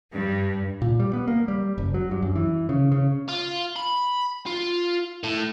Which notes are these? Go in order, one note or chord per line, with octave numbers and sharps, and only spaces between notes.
G2
A#2
G3
B3
A#3
G3
F#1
F#3
G2
F#2
E3
C#3
C#3
F4
B5
F4
A2